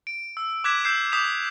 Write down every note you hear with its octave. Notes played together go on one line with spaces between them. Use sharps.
D7
E6
D6 F#6 G#6 B6 E7
E6 G6 C7 E7
D6 D#6 G6 B6 E7 F7